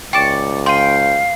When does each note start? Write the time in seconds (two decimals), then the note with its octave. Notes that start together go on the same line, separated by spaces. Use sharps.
0.13 C#2 D5 G5 C#6 D7 E7
0.66 F5 G5 C6 D#7